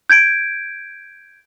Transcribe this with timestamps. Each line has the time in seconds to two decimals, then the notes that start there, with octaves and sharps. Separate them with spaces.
0.10 G6 G#6 D7